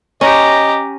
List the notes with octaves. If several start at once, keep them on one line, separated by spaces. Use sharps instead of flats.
C#4 G4 D#5 A#5